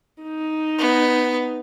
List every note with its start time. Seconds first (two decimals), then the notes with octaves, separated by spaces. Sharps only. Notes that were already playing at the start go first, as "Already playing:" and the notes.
0.23 D#4
0.78 B3